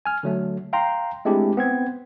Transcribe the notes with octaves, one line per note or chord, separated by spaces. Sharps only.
G#5 F6
D3 F#3 A3
F5 G5 A#5 C6
G#3 A3 C4 D4 E4 G4
B3 C4 G#6